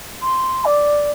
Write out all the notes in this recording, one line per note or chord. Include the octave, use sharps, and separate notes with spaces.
C6
D5